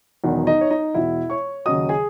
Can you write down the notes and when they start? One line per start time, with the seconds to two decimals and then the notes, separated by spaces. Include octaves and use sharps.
0.24 E1 E2 D#3 F#3
0.47 D#4 D#5
0.61 C#5
0.70 D#4 D#5
0.94 E1 E2 B2 E4 E5
1.30 C#5 C#6
1.66 D#2 C#3 F#3 D#5 D#6
1.89 G#4 G#5